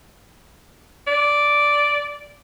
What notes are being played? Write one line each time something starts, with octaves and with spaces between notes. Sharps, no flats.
D5